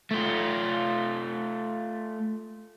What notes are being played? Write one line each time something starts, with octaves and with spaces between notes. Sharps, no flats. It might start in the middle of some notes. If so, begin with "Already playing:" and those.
A3 F4